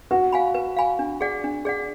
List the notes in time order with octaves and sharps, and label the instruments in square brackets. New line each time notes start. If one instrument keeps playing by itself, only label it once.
[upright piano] F#4 [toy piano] B4
[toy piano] F5 G#5 B5
B4
F5 G#5 B5
D4
G#4 D5 F#5
D4
G#4 D5 F#5